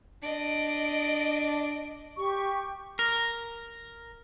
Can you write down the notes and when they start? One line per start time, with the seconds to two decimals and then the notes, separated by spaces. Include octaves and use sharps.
0.23 D4 D#5 D7
2.17 G4 C#6
2.99 A#4